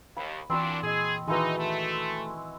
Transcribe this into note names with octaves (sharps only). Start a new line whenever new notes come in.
D#2 B5
A#2 E3 C4 D4 F#4 B5 C#6
A#2 G#4 D#5
D#3 E3 G#3 D#4 E4 F#4 B4
A3